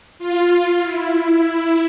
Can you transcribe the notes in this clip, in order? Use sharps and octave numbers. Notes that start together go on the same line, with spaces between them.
F4
E4